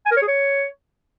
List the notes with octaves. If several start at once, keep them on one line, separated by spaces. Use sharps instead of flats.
G#5
A#4
C#5
G#4
C#5